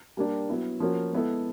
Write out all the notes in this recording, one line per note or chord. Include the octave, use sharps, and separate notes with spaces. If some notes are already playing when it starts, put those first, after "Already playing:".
G3 A#3 D4 G4
F#3 B3 E4
F3 A#3 C#4 F#4
G#3 B3 E4 A4